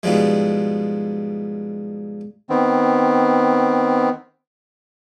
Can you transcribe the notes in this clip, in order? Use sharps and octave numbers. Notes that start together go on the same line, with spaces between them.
G#2 B2 F3 G3 G#3
D#3 B3 C4